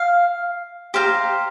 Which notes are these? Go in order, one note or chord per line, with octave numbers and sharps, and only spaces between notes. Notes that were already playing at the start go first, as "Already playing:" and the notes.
Already playing: F5
G4 C5 F5 A#5